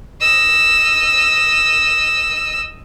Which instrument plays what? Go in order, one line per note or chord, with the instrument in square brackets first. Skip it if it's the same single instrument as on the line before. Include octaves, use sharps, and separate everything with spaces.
[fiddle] D#5 E6